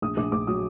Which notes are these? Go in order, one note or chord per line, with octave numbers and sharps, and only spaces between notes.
A#1 D#6
A#1 D6
A#1 D6
F#3 D#6